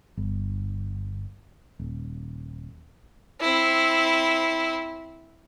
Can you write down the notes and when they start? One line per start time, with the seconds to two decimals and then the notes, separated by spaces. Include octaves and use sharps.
0.17 G1
1.79 D#1
3.41 C4 E4